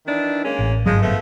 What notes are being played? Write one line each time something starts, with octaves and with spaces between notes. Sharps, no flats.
D#3 E3 D4
G#3 A#3 C#4
A1
G1 G#2 F3 F#3 G#3
F3 A3 B3